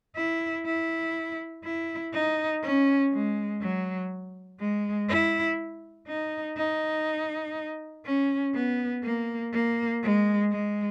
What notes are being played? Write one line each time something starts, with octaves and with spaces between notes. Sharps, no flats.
E4
E4
E4
D#4
C#4
G#3
F#3
G#3
E4
D#4
D#4
C#4
B3
A#3
A#3
G#3
G#3